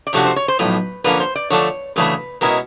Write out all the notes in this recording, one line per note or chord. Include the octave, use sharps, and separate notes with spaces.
D5
C3 F3 A3 D4 F#4 C#5
C5
C#5
C5
B1 A2 F3 B4
D3 F3 A#3 C#4 B4
C5
D5
D3 F3 A3 D4 C#5
D2 C#3 E3 A3 B4
B2 G#3 C#4 E4 A#4